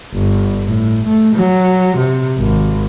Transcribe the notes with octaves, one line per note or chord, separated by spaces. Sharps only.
G1
A2
A3
F#3
C3
G#1